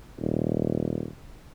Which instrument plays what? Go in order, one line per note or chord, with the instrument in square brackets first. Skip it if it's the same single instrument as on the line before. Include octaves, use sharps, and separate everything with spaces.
[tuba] D#1